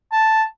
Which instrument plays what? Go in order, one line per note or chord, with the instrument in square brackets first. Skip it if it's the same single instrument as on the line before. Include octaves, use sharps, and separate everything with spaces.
[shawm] A5